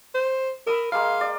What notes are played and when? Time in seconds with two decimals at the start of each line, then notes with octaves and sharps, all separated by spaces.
0.15 C5
0.67 A#4 B5 D#6 E6
0.92 G#3 A#3 F5 C6
1.21 D5